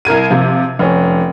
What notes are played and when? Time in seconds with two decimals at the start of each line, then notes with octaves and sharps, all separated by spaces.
0.05 C2 A#4 G#6 D#7
0.30 C3 F3
0.79 F1 C#4